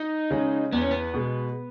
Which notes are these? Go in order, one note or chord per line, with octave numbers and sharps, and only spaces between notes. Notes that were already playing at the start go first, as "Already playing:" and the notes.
Already playing: D#4
C#3 G#3
E2 B3
C#4
B3
B2 G#3